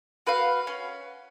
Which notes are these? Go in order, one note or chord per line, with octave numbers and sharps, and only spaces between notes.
F#4 B4 F5
C#4